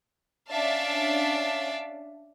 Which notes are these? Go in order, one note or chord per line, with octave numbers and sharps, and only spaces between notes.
C#4 D4 D5 E5 F5 A5